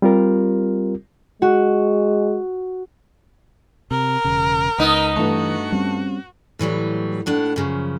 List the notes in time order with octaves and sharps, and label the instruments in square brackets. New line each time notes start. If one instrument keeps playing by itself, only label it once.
[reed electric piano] G3 C4 F4 G4 A#4
[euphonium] G#3 [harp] F#4
[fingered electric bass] C3 [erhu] A#4
[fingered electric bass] E1 C#3
[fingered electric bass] C#2 [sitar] B3 D#4
[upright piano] G2 A3 [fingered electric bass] E3 [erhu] F#4
[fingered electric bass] G3 C4 C#4
[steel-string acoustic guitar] A2 E3 F#3 G3
D#2 A2 D4 F#5
F#2 C#3 F3